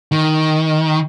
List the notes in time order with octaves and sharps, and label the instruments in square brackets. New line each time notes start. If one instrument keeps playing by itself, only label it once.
[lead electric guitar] D#3